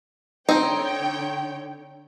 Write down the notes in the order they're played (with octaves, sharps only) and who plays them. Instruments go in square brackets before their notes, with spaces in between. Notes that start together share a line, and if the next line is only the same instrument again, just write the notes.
[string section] D3 C#5 G5 [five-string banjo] C4 D#4